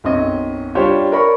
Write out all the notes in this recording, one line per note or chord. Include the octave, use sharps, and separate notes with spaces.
B1 F#2 C4 C#4 D#5
G3 D4 F4 G4 C5 C#5
A#4 C#5 D5 A#5 B5 C#6